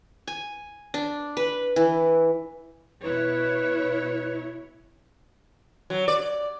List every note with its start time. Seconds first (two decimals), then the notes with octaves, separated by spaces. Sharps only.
0.27 G#5
0.94 D4
1.37 B4
1.76 E3
3.02 B2 E4 B4 C#5
5.90 F#3
6.08 D5